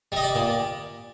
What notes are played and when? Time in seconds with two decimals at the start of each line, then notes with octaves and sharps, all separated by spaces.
0.12 G3 D#5
0.24 D5
0.35 A#2